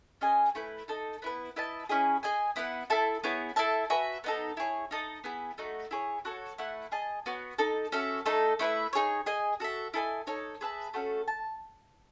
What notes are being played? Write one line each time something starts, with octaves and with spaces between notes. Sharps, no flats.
C#4 G#4 D#5 G#5
A3 E4 B4
D#4 A4 D#5
B3 E4 B4
E4 B4 D#5 A5
C#4 E4 G#4 D#5
G#4 D#5 G#5
B3 E4 B4 F#5
E4 A4 E5 A5
B3 E4 G#4 C#5
E4 A4 E5 A5
F#4 B4 E5 G#5
B3 D#4 A4
E4 G#4 C#5
D#4 A4 D#5
B3 E4 G#4
A3 D#4 F#4
E4 G#4 C#5
F#4 A4 C#5
A3 E4 B4 F#5
G#4 D#5 A5
B3 F#4 C#5
D#4 A4 D#5
C#4 F#4 A4 E5
A3 D#4 A4
A3 E4 B4 E5
D#4 G#4 C#5
G#4 D#5 G#5
F#4 A4 E5
E4 A4 D#5 G#5
D#4 A4 C#5
G#4 B4 E5 A5
A3 C#4 F#4 A4
A5